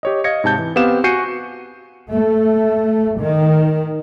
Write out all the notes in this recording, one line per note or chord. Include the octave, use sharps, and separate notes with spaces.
G4 C#5 D#5
D#5 F5 G#6 A#6 C#7
G#2 C3 A5 G6
E3
B3 C4 G4 F5 E7
F#4 G#5 G6 C7 C#7 D#7
A3
D#3